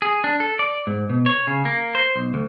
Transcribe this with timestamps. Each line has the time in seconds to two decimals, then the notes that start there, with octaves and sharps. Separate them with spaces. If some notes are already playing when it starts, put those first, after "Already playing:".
0.02 G#4
0.24 D4
0.40 A4
0.59 D5
0.87 G#2
1.10 B2
1.26 C#5
1.47 C#3
1.65 A#3
1.95 C5
2.16 B1
2.34 D2